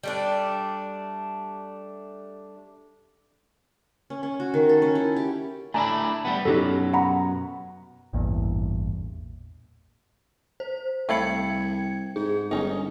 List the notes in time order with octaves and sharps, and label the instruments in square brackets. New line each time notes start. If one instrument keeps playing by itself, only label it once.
[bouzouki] G3 A3 D4
[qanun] C#4
C#4
F#4
D#3
A4
C#4
E4
G4
[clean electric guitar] A3 D4 E4 [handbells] G#5 A#5
[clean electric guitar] G3 B3
[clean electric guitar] F#2 B2 F#3 [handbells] D#4 G4 A4
[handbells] F#5 A#5 B5
[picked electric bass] A1 E2 G2 A#2
[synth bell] C5
[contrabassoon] C2 [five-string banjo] A3 F5 B5 [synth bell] G5 G#6 C#7
[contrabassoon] G#2 [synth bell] G#4
[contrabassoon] G1 [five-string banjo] C#4 D#4